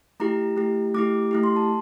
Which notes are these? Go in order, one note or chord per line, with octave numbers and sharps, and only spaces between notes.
A3 E4 G4 A#5
A3 E4 G4
A3 E4 G4 D6
A3 E4 G4
C6
A5